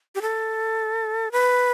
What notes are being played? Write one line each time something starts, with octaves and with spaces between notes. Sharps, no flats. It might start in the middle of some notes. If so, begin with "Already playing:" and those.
G4
A4
B4